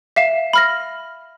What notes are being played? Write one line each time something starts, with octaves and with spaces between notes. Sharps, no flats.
E5 F5 E7
B5 F6 A#6